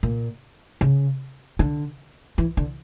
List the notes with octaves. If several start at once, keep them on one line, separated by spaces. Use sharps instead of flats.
A#2
C#3
D3
E3
D3